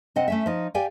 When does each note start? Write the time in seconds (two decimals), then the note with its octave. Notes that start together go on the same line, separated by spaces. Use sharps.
0.16 C3 C4 D#5 F#5
0.28 A3 C#4 E5
0.46 F3 D#4
0.74 G4 D5 F5 G5 G#5